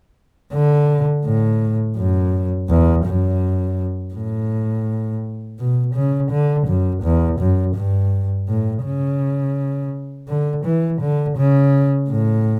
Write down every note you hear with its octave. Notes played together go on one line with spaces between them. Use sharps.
D3
A2
F#2
E2
F#2
A2
B2
C#3
D3
F#2
E2
F#2
G2
A2
C#3
D3
E3
D3
C#3
A2